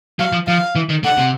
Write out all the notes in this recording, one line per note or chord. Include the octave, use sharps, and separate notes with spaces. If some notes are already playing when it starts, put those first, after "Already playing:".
F#3 F5
F3
F3 F5
E3
D#3
D3 F#5
C3